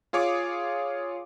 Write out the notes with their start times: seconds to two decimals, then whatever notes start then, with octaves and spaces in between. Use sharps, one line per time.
0.13 F4 G#4 C#5 F5 D6